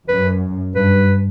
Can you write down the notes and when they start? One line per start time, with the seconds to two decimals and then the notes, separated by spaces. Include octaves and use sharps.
0.08 F#2 B4
0.75 G2 B4